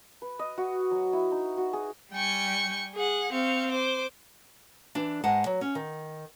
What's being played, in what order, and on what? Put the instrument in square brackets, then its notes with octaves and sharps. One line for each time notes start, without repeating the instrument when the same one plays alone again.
[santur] B4
D#5
F#4
F#3
E4
D#4
F#4
G#4
[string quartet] G3 G5 G#5 C#6
G#4 F#5
C4 F5 C#6
C5 D6
[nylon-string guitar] E3 D4
G#2 G#3 F#5 A5
F#3
C#4
D#3